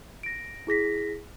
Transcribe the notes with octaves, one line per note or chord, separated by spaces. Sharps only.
A#6 D7
E4 G#4 A#6 B6